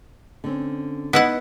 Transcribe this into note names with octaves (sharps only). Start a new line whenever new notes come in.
D3 C4 C#4
B3 D#4 E4 B4 D#5 F#5